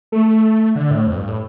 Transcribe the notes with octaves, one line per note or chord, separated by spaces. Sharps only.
A3
D3
A2
F2
G2
A2